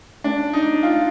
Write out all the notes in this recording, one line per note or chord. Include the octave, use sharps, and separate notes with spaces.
D4
D#4
F4